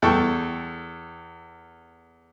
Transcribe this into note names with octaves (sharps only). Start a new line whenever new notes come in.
E2 A4 G5 C#6